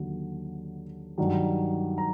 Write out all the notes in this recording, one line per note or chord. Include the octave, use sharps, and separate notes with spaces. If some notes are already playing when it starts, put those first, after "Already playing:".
Already playing: D#2 D3 F#3
G2 D#3 F#3
A#5